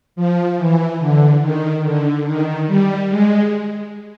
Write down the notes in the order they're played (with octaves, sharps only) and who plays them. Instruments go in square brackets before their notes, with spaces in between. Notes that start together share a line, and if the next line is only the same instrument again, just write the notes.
[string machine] F3
E3
D3
D#3
D3
D#3
G3
G#3